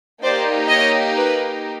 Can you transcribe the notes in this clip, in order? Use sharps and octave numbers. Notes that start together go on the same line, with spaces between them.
A#3 D#4 G4 C5 D5
C#5 D#5
B4